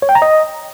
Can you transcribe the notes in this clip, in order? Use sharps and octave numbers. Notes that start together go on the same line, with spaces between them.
C#5
G5
A#5
D#5